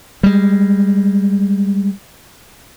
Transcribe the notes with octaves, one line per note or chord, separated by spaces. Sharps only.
G3 G#3